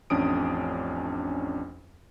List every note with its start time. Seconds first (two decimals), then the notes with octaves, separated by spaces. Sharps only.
0.10 A1 F2 C#4 D4 D#6 D7